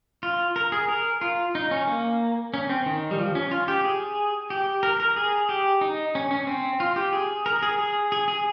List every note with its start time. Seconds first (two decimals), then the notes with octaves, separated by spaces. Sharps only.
0.23 F4
0.56 A#4
0.72 G#4
0.89 A#4
1.21 F4
1.55 D#4
1.71 C#4
1.87 A#3
2.54 C#4
2.69 C4
2.86 D#3
3.11 G3
3.19 F3
3.35 C#4
3.51 F4
3.68 G4
3.84 G#4
4.50 G4
4.83 A#4
5.00 A#4
5.16 G#4
5.49 G4
5.81 D#4
6.15 C#4
6.31 C#4
6.47 C4
6.80 F4
6.96 G4
7.13 G#4
7.46 A#4
7.63 G#4
7.79 G#4
8.12 G#4
8.28 G#4